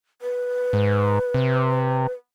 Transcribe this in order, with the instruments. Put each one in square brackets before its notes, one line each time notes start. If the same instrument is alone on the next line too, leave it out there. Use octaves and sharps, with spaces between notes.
[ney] B4
[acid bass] G#2
C3